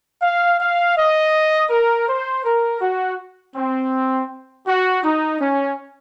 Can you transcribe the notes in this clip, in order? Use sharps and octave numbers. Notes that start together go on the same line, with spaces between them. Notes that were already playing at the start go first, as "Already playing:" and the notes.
F5
F5
D#5
A#4
C5
A#4
F#4
C4
F#4
D#4
C#4